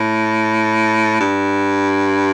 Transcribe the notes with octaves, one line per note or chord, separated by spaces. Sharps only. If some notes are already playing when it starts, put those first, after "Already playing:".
Already playing: A2
G2